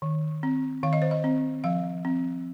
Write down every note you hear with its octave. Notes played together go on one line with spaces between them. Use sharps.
D#3
C4
D#3 F5
D#5
C5
D#5
C4
F3 F5
C4